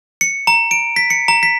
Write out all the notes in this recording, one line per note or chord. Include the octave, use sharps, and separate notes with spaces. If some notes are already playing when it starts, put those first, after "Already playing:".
C#7
A#5
D7
B6
C#7
A#5
B6